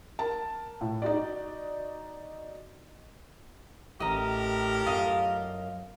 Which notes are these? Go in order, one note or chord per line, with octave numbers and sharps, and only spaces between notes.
A#4 A5
A2
D#4 F#4 D5
A1 A2 G4 A#4 D#5 A#5
F#2 F4 D#5 F5